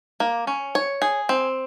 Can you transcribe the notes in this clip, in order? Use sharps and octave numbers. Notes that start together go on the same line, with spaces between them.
A#3
C#4
C#5
G#4
C4